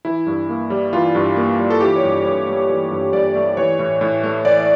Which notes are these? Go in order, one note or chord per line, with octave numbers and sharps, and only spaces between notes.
E3 E4
G2
A#3
G3
E3 F4
G2
A#3
G3
A4
E3 G4
C#5
G2
G2 C#5
A3
E3
G2
G2 D5
A3
E3 C#5
A2
A2
A3
E3 D5